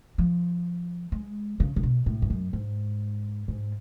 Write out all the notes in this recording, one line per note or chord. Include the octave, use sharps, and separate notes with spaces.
F3
G#3
C#3
C#3
B2
A2
G#2
F#2
G#2
G#2